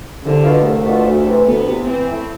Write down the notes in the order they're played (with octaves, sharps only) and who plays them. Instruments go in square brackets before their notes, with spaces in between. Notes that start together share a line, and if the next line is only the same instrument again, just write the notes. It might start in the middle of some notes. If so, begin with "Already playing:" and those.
[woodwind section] C2 [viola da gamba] D3
[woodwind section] B2 B3 D4 F4
[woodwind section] C2 [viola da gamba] A3
[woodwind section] B2 B3 D4 F4
D2
C3 E3
[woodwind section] D2 [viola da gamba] B3
[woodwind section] C3 E3
[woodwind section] E3 [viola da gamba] C4
[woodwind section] A3 E4